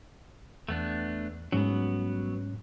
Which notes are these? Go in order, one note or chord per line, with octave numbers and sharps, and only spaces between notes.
E2 A3 B3 D4
G#2 F#3 G3 B3 C#4